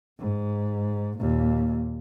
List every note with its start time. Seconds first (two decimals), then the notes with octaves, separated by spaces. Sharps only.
0.19 G#2
1.18 D#2 A#2